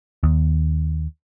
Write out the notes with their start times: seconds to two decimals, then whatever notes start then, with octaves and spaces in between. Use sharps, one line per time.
0.23 D#2